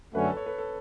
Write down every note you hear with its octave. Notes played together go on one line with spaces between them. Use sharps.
F#2 D3 A3 C#4 F#4 B4
A4
C#5
B4
A4